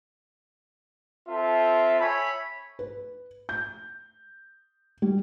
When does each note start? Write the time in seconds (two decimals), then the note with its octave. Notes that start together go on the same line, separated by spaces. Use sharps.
1.28 C4 F4 A4 E5
2.00 C#5 E5 G#5 B5
2.79 B4
3.49 G6
5.02 G3